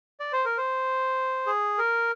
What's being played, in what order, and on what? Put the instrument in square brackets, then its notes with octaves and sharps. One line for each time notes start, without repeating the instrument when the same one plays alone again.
[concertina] D5
C5
A#4
C5
G#4
A#4